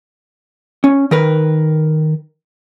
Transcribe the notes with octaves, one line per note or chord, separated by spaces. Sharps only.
C#4
D#3 A#4 B4